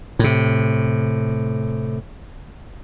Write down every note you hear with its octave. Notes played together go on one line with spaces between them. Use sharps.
A2 C3